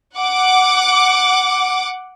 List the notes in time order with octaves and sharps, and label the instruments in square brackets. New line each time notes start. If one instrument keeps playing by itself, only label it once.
[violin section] F#5 D6